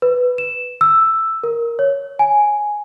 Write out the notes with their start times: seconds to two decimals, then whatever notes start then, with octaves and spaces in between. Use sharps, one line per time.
0.02 B4
0.38 E7
0.81 E6
1.43 A#4
1.79 C#5
2.19 G#5